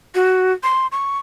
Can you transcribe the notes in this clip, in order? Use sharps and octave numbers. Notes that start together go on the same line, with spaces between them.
F#4
C6
C#6